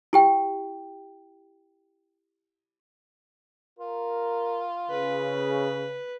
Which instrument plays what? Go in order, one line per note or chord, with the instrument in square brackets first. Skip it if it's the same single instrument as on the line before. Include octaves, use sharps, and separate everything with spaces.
[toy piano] E4 G4 G5
[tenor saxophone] F4 [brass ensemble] A#4
[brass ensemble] C#3 [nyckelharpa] B4